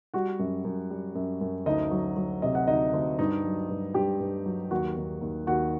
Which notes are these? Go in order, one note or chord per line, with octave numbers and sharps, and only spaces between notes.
G3 F#4 F#5
F#2
F#2
G3
F#2
F#2
D2 D#4 D#5
F#3
F#3
C3 D#5
F#5
D2 D#4 D#5
D2
G2 D#4 D#5
F#3
G2
G2 G4 G5
G2
F#3
D#2 F#4 F#5
D#2
D#2
D#2 F#4 F#5